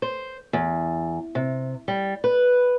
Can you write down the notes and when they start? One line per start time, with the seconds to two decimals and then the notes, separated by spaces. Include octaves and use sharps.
0.02 C5
0.53 E2
1.35 C3
1.88 G3
2.24 B4